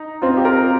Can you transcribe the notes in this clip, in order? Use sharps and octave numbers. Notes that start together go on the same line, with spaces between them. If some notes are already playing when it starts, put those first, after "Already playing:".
Already playing: D#4
C4 F4
G4
F4 A#4